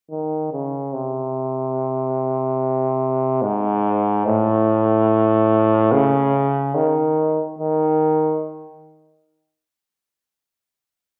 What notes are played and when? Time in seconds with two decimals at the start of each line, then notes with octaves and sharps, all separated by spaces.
0.11 D#3
0.52 C#3
0.93 C3
3.42 G#2
4.26 A2
5.92 C#3
6.75 D#3
7.59 D#3